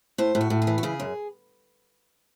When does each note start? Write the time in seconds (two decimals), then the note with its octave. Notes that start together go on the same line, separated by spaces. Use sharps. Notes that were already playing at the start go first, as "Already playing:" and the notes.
0.18 A2 C5
0.35 A2
0.41 F#4
0.50 A2
0.62 G#4
0.67 E3
0.78 F#4
0.83 C#3 G#4
1.00 F#2